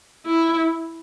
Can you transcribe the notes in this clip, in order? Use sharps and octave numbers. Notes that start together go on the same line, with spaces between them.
E4